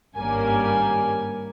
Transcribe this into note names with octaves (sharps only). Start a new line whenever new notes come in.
G#1 G2 G3 A#3 C#4 G#5